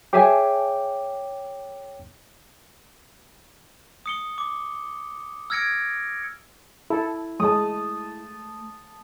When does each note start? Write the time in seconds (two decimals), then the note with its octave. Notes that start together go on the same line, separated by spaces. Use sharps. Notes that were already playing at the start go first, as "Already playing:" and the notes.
0.13 G#4 C#5 E5 G5 G#5 D6
4.06 D#6 C#7 G7
4.38 D6
5.50 E6 F6 G#6 A#6 C#7 D7
6.90 E4 A4
7.40 G#3 A3 A5 D#6